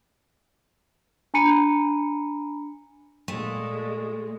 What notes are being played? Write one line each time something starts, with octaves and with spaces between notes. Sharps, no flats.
D4 G#5 A#5 B5 C#7 D#7
A#2 G#3 A3